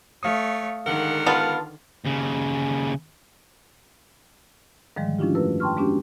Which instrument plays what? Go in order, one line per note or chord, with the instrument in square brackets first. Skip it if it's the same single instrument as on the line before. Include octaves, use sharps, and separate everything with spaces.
[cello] A3 C#5 [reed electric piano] F5 D#6
[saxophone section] G#2 A#4 F#5 [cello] D3 D#3
[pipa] B3 F4 [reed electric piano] A5
[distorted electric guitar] D#2 C#3
[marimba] G#2 D3 D#3 F3 G3 G#3
F3 C#4 D4 E4 F4 G4
F#2 A3 A#4 B4 E6
G5 A5 C6 C#6 F6
G#3 B3 C#4 D4 F#4 G4